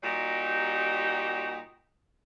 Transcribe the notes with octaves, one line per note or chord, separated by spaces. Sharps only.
A#2 G3 D#4 F#4 G4